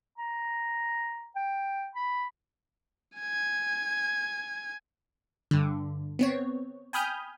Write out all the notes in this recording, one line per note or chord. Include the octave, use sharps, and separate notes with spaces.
A#5
G5
B5
G#5 G#6
G2 D3
B3 C4 C#5
G5 G#5 B5 D#6 F6 G6